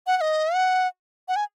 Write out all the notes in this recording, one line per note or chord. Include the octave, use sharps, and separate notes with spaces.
F#5
F#5
D#5
F#5
F#5
G#5